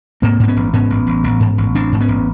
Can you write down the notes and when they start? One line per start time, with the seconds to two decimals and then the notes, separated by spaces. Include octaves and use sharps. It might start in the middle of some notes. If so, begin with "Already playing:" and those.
0.22 G#2 A#3 C4
0.40 G#2 C4
0.48 B3 C#4
0.57 A1
0.74 G#2 B3 C#4
0.90 A1
1.07 A1
1.24 A1
1.40 G#2
1.58 A1
1.75 A1 C4 D4
1.92 G#2
2.01 B3 C#4
2.08 A1